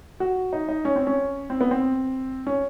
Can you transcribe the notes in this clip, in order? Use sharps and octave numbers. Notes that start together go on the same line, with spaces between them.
F#4
D#4
D#4
C#4
C4
C#4
C4
B3
C4
C#4